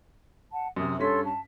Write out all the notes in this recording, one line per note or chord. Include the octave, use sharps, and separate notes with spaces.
F#5 A5
F#2 C3 D#6
G2 C#4 A4 C#5 C6 B6
A5